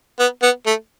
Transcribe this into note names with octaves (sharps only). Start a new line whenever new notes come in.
B3
B3
A3